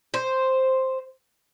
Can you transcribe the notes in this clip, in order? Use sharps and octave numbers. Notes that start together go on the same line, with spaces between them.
C5